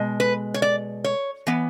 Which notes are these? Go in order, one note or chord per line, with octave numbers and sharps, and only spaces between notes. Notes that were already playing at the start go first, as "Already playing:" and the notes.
Already playing: B2 G#3
B4
C#5
D5
C#5
E3 B3